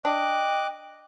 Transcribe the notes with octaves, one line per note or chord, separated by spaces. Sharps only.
D4 D#5 G5 D6 F#6